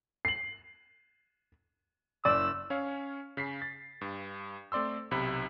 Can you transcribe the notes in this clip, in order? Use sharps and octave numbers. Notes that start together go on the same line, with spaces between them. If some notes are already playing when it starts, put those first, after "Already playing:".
C7 F#7
F#1 D5 E6
C#4 C#5 F5
C#3 B6 C7
A6
G2
A3 C4 D5 C6 E6
B1 C3 B5 B6